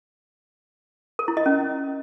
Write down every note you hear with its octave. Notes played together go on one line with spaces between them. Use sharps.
A#4
E4
D#5
C#4